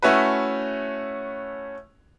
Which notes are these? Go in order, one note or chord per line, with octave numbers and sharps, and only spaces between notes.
A3 C#4 E4 F#4 B4